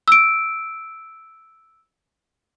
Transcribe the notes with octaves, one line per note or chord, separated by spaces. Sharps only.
E6 D7